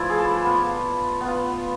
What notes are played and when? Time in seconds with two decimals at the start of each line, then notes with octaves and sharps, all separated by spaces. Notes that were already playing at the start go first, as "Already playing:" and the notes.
Already playing: F3 A3 E4 B4 D5
0.10 G#4
0.19 A4
0.44 B3 F4
1.21 B3
1.26 F4